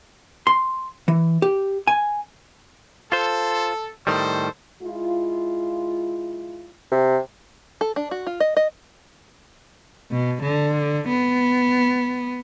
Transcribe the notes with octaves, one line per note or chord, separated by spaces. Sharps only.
C6
E3
G4
G#5
F4 A4 C5
A2 D#3 G3 A4 C5
G#3 E4 F4
C3
A4
D4
F#4
F4
D#5
D#5
B2
D3
B3